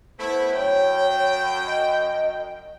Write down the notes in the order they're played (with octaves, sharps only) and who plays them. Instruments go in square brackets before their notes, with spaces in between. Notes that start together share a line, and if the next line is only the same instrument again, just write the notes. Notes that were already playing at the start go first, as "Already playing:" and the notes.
[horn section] A3 B3 E4 [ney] C5
[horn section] F#2 G5 [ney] C#5
[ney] D#5